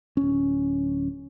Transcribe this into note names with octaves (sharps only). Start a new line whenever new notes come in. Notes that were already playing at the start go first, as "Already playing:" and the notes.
D1 C#4